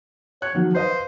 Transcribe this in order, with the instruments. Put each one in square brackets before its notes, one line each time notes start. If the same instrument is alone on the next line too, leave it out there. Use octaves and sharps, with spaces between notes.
[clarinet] C#5 [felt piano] F#6
[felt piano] D#3 F#3 [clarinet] F3
[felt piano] B4 D#5 F5 [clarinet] C5